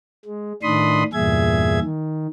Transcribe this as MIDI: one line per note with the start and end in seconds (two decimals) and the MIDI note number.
0.25 0.53 56
0.63 1.03 45
0.63 1.03 51
0.63 1.03 62
0.63 1.03 83
0.63 1.03 84
0.63 1.03 87
1.13 1.79 40
1.13 1.79 43
1.13 1.79 46
1.13 1.79 68
1.13 1.79 76
1.13 1.79 92
1.81 2.27 51